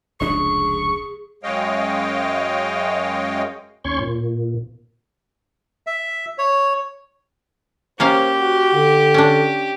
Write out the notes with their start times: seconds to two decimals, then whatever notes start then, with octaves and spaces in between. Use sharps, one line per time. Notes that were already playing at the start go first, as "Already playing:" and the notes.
0.20 F1 C#2 D4 G#4 C#6
1.43 F#2 G#3 C#5 D#5 F5 G5
3.84 D#2 C#4 C#5 C6 C#6
4.00 A#2
5.87 E5
6.38 C#5
8.00 A#3 C#4 G4 C5 F5
8.39 F#4
8.74 D3
9.14 C#4 D4